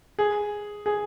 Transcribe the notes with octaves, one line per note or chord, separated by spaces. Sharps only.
G#4
G#4